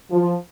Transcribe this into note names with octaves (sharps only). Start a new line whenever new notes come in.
F3